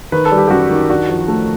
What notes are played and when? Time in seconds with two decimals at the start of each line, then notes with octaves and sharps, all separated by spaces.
0.12 D#3 B4
0.25 A4
0.31 G3
0.37 G4
0.48 G4
0.50 F#2 F#4
0.71 D#3
0.90 D4 F#4
1.09 F3
1.28 A3